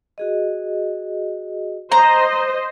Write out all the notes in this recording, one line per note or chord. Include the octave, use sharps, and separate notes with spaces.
F#4 G#4 D#5
C5 D#5 A#5